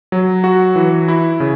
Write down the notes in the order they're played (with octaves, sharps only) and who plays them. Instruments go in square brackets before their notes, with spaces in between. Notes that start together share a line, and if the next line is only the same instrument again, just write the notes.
[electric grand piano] F#3
F#4
E3
E4
C#3